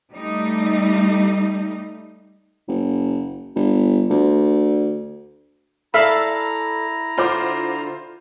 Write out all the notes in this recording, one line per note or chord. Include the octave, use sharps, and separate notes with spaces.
G3 A3 D#4
F#1
G1
D2
E4 A4 D5 E5 F5 A#5 B5 E6
D3 F4 F#4 C5 D6